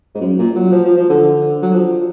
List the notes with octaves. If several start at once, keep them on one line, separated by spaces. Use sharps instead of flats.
G#2
F#2
A#2
F#3
F3
F3
F3
D3
F#3
F3